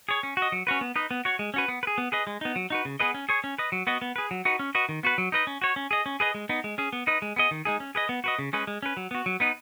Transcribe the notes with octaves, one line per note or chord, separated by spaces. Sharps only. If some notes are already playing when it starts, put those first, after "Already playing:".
G#4 C#5
C#4
F#4
D#5
F#3
C#4 F#4 B4
B3
D#4 B4 D#5
B3
F#4 C#5
G#3
C#4 F#4 B4
B3
B4
G#4
B3
G#4 B4 D#5
G#3
B3 D#4
F#3
D#4 F#4 B4
C#3
B3 G#4 B4 D#5
C#4
G#4 C#5
C#4
B4 D#5
F#3
B3 F#4 D#5
B3
G#4 B4
F#3
D#4 F#4 B4
C#4
F#4 B4 D#5
D#3
B3 F#4 B4
F#3
D#4 B4 D#5
C#4
F#4 C#5
C#4
G#4 D#5
C#4
G#4 B4 D#5
G#3
B3 D#4
G#3
C#4 G#4
B3
D#4 B4 D#5
G#3
B3 G#4 D#5
D#3
G#3 D#4 G#4
C#4
G#4 B4 D#5
B3
F#4 B4 D#5
C#3
G#3 C#4 G#4 B4
G#3
C#4 B4
F#3
B3 F#4
F#3
B3 D#4 B4